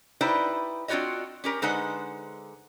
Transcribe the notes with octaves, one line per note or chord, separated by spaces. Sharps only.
D#4 E4 G4 B4 C5 D5
C4 D4 F4 F#4 C#5 D#5
C#4 G4 A#4
D3 G#3 D#4 B4 C5 F#5